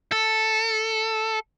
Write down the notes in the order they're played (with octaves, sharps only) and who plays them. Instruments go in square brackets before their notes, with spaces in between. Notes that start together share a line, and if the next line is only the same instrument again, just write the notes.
[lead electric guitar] A4